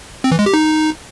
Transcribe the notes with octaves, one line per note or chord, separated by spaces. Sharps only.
C4
E3
G#3
G4
D#4